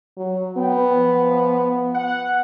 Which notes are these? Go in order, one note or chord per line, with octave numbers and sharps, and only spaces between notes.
F#3
B3 A4 G5
F3
F#5